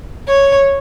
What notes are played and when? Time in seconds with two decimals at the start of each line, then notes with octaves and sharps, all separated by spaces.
0.28 C#5